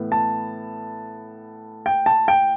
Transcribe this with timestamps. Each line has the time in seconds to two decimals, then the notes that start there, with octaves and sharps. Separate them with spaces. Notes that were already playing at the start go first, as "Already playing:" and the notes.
Already playing: A2 E3 B3
0.12 A5
1.86 G5
2.06 A5
2.28 G5